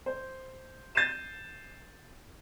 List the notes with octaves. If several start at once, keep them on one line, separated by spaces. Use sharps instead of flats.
C5
G6 A6 C7 D#7 E7